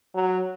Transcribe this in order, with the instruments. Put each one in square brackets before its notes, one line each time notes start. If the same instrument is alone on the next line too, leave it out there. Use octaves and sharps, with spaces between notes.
[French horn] F#3